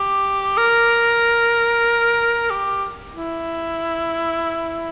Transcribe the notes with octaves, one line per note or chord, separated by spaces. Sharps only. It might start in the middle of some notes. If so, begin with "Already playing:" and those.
Already playing: G4
A#4
G4
E4